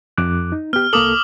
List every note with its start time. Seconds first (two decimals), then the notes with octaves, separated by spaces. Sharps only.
0.18 F2 D6 F#6
0.52 D#4
0.73 B3 G4 F6
0.93 C2 A#3 A4 D6 D#6 F#7